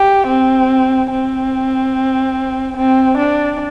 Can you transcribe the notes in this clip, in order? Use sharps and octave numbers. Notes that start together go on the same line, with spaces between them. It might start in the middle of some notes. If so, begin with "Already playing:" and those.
Already playing: G4
C4
C4
C4
D4